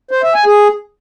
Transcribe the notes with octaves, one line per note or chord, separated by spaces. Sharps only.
C5
E5
G#5
G#4